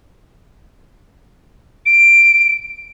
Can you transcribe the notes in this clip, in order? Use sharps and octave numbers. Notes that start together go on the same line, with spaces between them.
D7